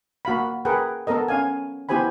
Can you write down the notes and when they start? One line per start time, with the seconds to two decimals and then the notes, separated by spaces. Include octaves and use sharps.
0.25 A#3 F#4 F5 B5
0.65 G#4 A#4 B4 F#5 G5
1.07 B3 A4 A#4 D#5
1.28 C#4 F5 G#5
1.89 B3 E4 G4 C5 G#5 B5